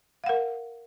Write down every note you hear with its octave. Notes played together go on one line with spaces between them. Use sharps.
A#4 F5 F#5